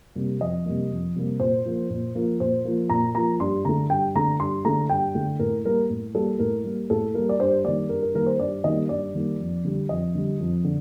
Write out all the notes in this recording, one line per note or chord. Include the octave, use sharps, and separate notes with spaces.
C3 G3 A#3
F2 D#5
C3 G3 A#3
F2
C3 G3 A#3
A#2 C5
F3 A#3
A#2
F3 A#3
A#2 C5
F3 A#3
A#2 A#5
F3 A#3 A#5
G2 C6
D3 A3 A#5
G2 G5
D3 A3 A#5
G2 C6
D3 A3 A#5
G2 G5
D3 A3
A2 A#4
G3 A#3 A#4
A2
G3 A#3 A4
A2 A#4
G3 A#3
A2 A4
G3 A#3 A#4
D5
G2 C5
D#3 G3 A#3 D5
G2 A#4
A#4
D#3 G3 A#3 A#4
C5
G2 D5
D#3 G3 A#3 D#5
G2 D5
D#3 G3 A#3
F2
D3 G3
F2 D#5
D3 G3
F2
D3